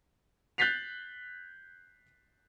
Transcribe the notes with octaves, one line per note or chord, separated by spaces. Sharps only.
F#6 G6 A6 B6 C7 F7